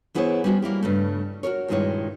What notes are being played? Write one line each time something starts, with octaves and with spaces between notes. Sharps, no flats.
E3 B3 E4 G#4 C5 C#5
G3 B3 C#4 E4 F#4 C5
G3 A#3 E4 G4
G2 C#3 A3
F#4 A4 A#4 C#5
G2 A#2 D#3 G#3 E4 C#5